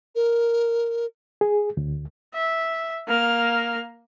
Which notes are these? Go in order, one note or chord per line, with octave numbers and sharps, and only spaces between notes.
A#4
G#4
D2
E5
A#3 F6